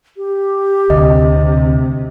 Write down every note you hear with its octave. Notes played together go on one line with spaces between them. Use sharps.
G4
D2 C3 D#5